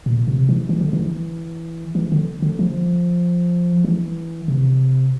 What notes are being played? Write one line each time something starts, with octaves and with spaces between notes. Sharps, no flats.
A#2
C3
E3
E3
D3
E3
E3
D3
D3
F3
E3
C3